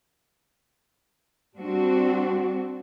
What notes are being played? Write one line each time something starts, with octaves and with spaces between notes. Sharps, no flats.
G3 C4 D4 F#4